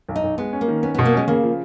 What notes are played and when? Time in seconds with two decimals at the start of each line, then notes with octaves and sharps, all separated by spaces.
0.09 B1
0.16 D#4
0.24 B1
0.38 G#3 B3
0.53 C#4
0.61 A#3
0.68 D#3
0.83 B3 C#4
0.95 B2 B3
1.05 A#3
1.13 G#3 C#4
1.27 C#3 A#3
1.43 F3